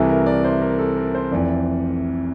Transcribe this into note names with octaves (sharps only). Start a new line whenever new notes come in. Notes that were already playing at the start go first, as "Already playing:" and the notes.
Already playing: C2 C3 E3 A4
A#4
D5
C5
A#4
A4
A#4
C5
F1 F2 E3 D5